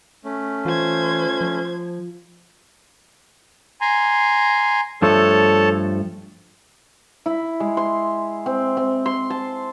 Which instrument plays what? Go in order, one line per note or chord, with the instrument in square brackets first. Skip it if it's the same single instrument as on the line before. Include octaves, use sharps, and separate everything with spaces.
[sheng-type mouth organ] A3 C#4
[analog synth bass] E3 [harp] F4 [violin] C5 G#6
[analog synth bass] F3
[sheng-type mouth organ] G#5 A#5 C6
[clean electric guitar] G2 F3 A3 [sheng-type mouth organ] A4 C#5 A5
[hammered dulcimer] E4
G#3
C6
C4
C4
C6
A5